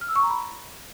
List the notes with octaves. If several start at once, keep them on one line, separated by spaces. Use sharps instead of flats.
F6
E6
C#6
A#5
B5